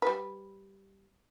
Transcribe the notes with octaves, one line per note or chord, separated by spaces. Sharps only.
G3 B4